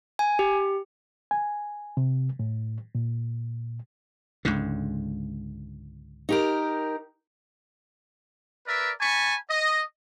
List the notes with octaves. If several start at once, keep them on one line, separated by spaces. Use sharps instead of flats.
G#5
G4
G#5
C3
A2
A#2
C#2 G#2 D3
D#4 G4 A#4
A#4 B4 D5 E5
G#5 A5 B5 C#6
D#5